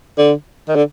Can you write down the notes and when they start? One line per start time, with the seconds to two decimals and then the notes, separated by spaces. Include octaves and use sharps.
0.18 D3
0.68 D#3
0.75 D3